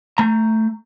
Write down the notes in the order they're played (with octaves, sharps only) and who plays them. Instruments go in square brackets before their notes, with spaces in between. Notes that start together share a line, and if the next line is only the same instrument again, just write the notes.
[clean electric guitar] A3 A#5